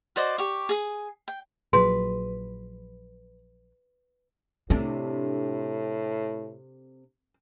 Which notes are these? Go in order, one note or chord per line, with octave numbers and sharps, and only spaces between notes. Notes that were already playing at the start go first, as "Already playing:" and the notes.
F#4 C5 D5 D#5
G4 C#6
G#4 D#6
G5
A#1 F3 F#3 G#4 B4 C6
A2 C3 A3 C4 D4